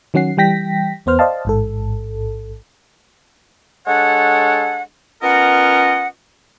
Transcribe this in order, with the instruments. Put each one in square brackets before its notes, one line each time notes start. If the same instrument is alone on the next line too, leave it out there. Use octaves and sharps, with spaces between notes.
[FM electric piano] D#3 F#3 C#4 F#5 C7
E3 G3 G5 A#6 B6
E2 B3 C5 F6
C5 D5 D#5 F5 A5
A1 G#2 A4
[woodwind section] G#3 D4 A4 C#5 F#5
B3 C#4 F4 A#4 D#5 F#5